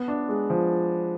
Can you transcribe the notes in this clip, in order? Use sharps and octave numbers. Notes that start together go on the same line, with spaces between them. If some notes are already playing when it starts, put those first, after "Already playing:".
Already playing: B3
D4
G#3
F3